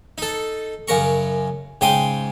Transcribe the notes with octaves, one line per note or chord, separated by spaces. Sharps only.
D#4 A4
F#2 C#3 A#4 A#5 C#6
G#2 C#3 G5 C6 D6 D#6